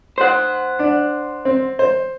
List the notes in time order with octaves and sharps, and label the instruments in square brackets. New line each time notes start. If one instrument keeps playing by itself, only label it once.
[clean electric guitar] C5 F#5
[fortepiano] D4
C4
C5